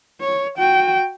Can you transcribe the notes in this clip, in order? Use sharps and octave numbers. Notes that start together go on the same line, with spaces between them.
C#5
F#4 G5